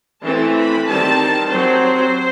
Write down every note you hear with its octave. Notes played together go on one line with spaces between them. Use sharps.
E3 A3 C4 A5
B5
D#3 G3 C4 A5
F#3 C4 C5